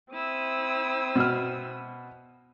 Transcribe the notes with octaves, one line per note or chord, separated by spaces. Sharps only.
C4 E4 D#6 E6
B2 F6